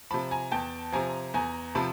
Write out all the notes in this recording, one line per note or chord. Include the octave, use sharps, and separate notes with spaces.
C3 F3 A5 B5
G#5 A#5
E2 G5 A5
C3 F3 G#5 A#5
E2 G#5 A#5
C3 F3 A5 B5